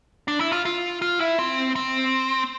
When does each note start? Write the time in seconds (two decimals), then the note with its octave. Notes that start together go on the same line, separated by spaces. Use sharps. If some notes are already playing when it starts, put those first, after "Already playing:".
0.28 D4
0.40 E4
0.52 F4
0.65 F4
1.02 F4
1.20 E4
1.39 C4
1.76 C4